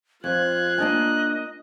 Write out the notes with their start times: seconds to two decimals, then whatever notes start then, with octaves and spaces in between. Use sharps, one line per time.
0.24 F2 F4 F#6 G#6
0.78 A#3 D4 D#5 G#5